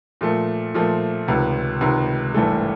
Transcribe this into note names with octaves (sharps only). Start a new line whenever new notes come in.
A#2 F3 A3
A#2 F3 A3
C#2 C3 D#3
C#2 C3 D#3
G#1 G2 E3 A3